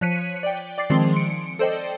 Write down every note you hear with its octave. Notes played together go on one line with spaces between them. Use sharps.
F3 C#5 F#6 B6 C#7 D#7
D5 G5
D5 D6 A6 C7
D#3 F3 G#3 C4 G#4 C6
C#7 D7
A4 C5 D5 D#5 G5